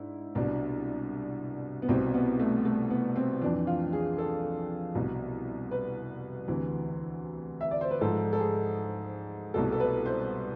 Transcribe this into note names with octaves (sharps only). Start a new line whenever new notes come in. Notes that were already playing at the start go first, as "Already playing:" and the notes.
Already playing: G#2 D4 E4
C2 B2 D4
B3
C2 B2 C4
B3
A3
A3
B3
C4
F2 E3 D4
F4
G#4
A4
C2 B2
B4
D2 C3 E3
E5
D5
C5
B4
G#2 F3 A4
A4
G#4
C2 B2 A4
A4
B4
C5